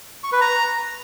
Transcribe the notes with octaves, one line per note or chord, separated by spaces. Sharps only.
C#6
B4
A#5